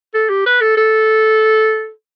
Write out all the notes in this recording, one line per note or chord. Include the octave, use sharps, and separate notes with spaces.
A4
G4
B4
A4
A4